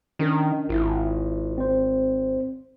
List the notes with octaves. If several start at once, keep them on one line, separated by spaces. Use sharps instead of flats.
D#3 C#4 D4 A#4
G#1 E4 F4
C4 C5